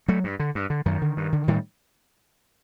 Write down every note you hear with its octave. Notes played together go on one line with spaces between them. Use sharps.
F#3 A3
G2
D3
G2
D3
F#2 D#3
D3
G2
D3
A2 D#3 G3